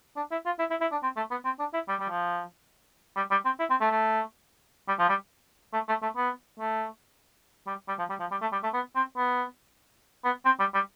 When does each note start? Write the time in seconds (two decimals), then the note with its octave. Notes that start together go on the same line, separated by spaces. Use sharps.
0.17 D4
0.31 E4
0.46 F4
0.59 E4
0.70 E4
0.81 E4
0.92 D4
1.03 C4
1.17 A3
1.31 B3
1.45 C4
1.59 D4
1.74 E4
1.88 G3
2.00 G3
2.09 F3
3.17 G3
3.31 G3
3.45 C4
3.59 E4
3.70 C4
3.81 A3
3.91 A3
4.88 G3
4.99 F3
5.09 G3
5.74 A3
5.88 A3
6.03 A3
6.17 B3
6.60 A3
7.67 G3
7.88 G3
7.99 F3
8.10 G3
8.20 F3
8.31 G3
8.41 A3
8.52 G3
8.63 A3
8.73 B3
8.96 C4
9.17 B3
10.25 B3
10.46 C4
10.60 G3
10.74 G3